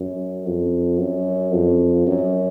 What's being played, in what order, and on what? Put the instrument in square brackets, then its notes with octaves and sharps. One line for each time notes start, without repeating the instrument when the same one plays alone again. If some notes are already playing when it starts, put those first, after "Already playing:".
Already playing: [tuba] F#2
F2
F#2
F2
F#2